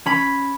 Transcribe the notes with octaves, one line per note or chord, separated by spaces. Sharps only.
C#4 B5